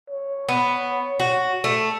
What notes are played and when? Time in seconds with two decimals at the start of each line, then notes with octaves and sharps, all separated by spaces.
0.10 C#5
0.49 B3
1.19 F#4
1.64 A3